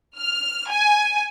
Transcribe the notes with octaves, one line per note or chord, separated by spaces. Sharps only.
F6
G#5